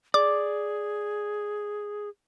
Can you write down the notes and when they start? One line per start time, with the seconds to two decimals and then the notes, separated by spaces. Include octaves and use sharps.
0.14 G#4 D5 D6